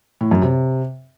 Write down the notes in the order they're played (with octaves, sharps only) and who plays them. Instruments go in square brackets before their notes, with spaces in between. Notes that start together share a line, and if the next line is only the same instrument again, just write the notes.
[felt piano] A2
F#2
C3